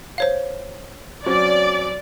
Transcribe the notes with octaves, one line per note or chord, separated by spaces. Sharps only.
C5 C#5 F5
F#3 C4 C#4 D5